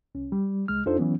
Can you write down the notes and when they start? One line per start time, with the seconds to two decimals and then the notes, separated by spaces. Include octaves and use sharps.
0.15 C2 C#4
0.32 G3
0.68 C2 G#3 F6
0.86 F2 D4 D#4 F4 A4 C5
0.98 E3 F#3 B3 C#4